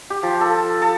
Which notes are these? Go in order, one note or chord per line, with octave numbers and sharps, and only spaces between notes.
G4
F3
A4
A4